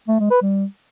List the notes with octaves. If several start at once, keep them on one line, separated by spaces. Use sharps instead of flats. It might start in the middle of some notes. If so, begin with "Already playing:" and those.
A3
G#3
B4
G3